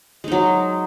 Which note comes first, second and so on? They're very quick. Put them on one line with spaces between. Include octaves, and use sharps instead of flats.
G#3 D#4 F#3